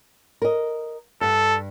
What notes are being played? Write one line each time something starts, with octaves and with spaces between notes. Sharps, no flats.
A#4 D#5
G2 A4